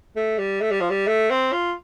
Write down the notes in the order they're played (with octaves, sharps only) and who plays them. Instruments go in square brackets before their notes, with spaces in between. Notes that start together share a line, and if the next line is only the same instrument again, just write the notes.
[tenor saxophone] A3
G3
A3
G3
F3
G3
A3
C4
F4